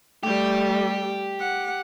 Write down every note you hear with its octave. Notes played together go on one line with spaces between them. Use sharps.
G3 A3 G4
F#5